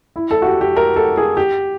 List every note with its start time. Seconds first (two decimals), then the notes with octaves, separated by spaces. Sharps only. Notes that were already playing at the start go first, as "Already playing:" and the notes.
0.16 E4
0.31 A4
0.42 F#4
0.46 G4
0.61 G4
0.77 A#4
0.96 A4
1.17 G#4
1.37 G4